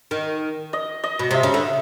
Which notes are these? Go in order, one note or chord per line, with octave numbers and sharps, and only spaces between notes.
D#3
D#5
D#5
B2
C3 E5
C#3
D3